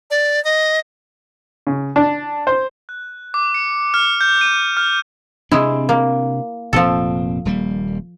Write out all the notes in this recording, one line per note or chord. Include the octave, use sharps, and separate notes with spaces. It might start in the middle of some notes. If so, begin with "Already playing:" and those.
D5
D#5
C#3
D4
C5
F#6
D6
C#7
F6
G6
D#7
F6
C3 G#3 C4 D4 E4
A#3
F1 A#2 F3 C4 A4
D#1 G3 A#3